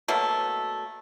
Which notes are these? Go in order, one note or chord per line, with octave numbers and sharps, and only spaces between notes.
B2 F#3 A3 A#3